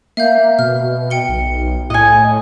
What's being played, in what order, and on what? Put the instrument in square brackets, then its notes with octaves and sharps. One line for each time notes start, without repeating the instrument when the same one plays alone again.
[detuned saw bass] A#3 [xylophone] E5 F5 G6
[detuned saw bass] B2 [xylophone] F6
[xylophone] G5 C#7 G7
[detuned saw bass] B1
[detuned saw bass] A2 [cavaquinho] D#5 G#5